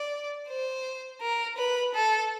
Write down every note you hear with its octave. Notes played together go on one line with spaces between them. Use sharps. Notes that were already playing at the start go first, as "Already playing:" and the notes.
Already playing: D5
C5
A#4
B4
A4